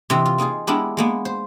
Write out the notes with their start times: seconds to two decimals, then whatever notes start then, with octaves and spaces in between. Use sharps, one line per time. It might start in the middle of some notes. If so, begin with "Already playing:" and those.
0.10 C3 E3 C4 D#5
0.26 F4
0.38 A#3 D#4 F4 G#4
0.67 G#3 B3 D4 E4 G4 A#4
0.97 G#3 A#3 B3
1.25 C5